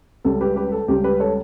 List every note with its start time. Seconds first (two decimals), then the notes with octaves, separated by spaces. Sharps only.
0.25 C#2 C#3 G3 A4
0.41 G4 B4
0.56 G4 B4
0.72 A4
0.88 C#2 C#3 G3 G4
1.04 G4 B4
1.20 A4 C#5